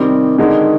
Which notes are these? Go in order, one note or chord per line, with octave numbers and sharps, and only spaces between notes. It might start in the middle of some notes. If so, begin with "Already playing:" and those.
Already playing: C3 D#3 G3 C4
D3 D#3 G#3 D#4